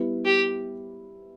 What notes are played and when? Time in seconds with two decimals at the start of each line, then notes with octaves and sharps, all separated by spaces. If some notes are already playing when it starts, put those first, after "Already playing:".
Already playing: G3 B3 E4 B4
0.25 G4